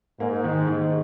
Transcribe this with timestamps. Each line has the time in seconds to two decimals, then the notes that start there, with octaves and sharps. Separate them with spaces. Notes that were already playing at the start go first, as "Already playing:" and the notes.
0.20 G#2 A#3
0.44 D#3
0.67 D#3